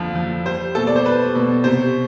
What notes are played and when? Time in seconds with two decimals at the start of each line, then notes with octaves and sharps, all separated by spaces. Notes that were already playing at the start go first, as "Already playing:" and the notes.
Already playing: F2 D3 F3
0.15 F3
0.45 G3 C5
0.75 B2 A4
0.87 D5
0.96 C5
1.05 G3 B4
1.35 B2
1.64 C3 C5